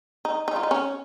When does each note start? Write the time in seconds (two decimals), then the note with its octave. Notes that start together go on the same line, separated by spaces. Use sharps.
0.25 D#4
0.48 D#4
0.56 F4
0.63 D#4
0.71 C#4